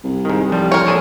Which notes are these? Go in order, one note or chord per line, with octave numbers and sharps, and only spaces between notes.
C2
G#2 D#3
A1 F3 G3
A#4 C#5
A#1 G#4 A4